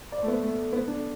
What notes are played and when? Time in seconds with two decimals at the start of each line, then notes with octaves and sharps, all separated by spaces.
0.12 D5
0.23 A3
0.28 B3
0.42 A3
0.72 B3
0.88 D4